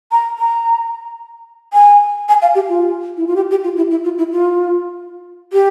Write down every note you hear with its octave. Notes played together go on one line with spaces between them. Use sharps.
A#5
A#5
G#5
G#5
F5
G4
F4
E4
F4
G4
G4
F4
E4
E4
F4
E4
F4
G4